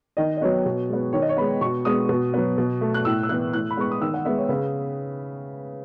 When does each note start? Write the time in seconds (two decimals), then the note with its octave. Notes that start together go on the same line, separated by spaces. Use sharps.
0.17 D#3 D#5
0.37 D#5
0.41 F#3 B3 C#5
0.65 B2
0.89 G#3 B3
1.13 D#3 C#5
1.22 D#5
1.29 C#5
1.37 G#3 B3 B5
1.61 B2 C#6
1.85 G#3 B3 D#6
2.09 B2
2.34 F#3 B3
2.58 B2
2.81 A3
2.94 F#6
3.05 A2 E6
3.23 E6
3.29 E3 B3 F#6
3.53 A2 F#6
3.71 B5
3.77 G#3 B3 C#6
3.91 D#6
4.01 D#3 E6
4.14 F#5
4.25 G#3 B3 E5
4.38 C#5
4.49 C#3 B4